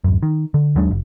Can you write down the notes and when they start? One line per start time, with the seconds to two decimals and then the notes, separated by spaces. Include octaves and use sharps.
0.04 D1 F#2
0.23 D#3
0.54 D3
0.75 D#2 F#3 G#3 D4
0.91 F#1